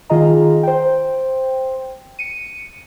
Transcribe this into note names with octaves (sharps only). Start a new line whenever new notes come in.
D#3 F4 G#4 D#5 A#5
C5 G5
C#7 D#7